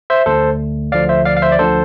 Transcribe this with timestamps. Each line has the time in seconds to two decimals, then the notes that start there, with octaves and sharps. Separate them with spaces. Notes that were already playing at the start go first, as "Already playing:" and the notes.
0.10 C5 E5
0.26 D2 D3 A3 A4 C5
0.92 D2 D3 F3 D5 F5
1.09 C5 E5
1.25 D5 F5
1.37 F5
1.42 C5 E5
1.52 D5
1.59 D2 D3 F3 A4 C5